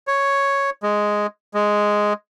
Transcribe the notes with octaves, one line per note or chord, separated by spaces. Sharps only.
C#5
G#3
G#3